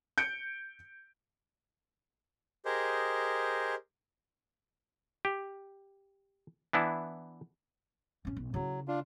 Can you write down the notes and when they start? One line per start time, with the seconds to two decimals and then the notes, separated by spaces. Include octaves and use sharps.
0.18 G6 C#7 D7
2.65 G4 G#4 A#4 C5 D#5
5.25 G4
6.73 E3 B3 D4 E4
8.25 G2 C#4
8.37 B1
8.54 C#3 F#3 E4
8.88 D4 F4